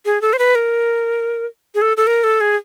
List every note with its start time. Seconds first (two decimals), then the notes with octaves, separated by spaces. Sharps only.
0.05 G#4
0.22 A4
0.33 C5
0.39 B4
0.55 A#4
1.75 G#4
1.82 A4
1.97 A4
2.07 A#4
2.24 A4
2.41 G#4